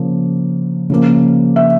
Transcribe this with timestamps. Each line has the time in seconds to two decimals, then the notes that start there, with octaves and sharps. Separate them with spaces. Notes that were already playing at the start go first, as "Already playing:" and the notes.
Already playing: C#3 F3 A#3
0.90 C#3 F3 A#3
1.56 E5